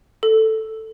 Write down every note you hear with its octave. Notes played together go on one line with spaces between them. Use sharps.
A4